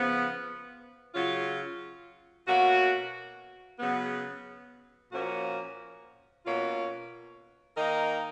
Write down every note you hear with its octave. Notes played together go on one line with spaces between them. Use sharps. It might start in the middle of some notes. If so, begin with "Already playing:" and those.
Already playing: C#3 F3 B3
C#3 F#3 C#4 F4
B2 A#3 C#4 F#4
C#3 F#3 B3
A#2 F3 A#3 C#4 F#4
B2 A#3 C#4 F4
D#3 A#3 D#4 A#4 D#5